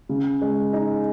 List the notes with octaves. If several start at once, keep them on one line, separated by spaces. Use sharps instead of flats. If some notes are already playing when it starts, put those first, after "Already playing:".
C#3
G#3
D#4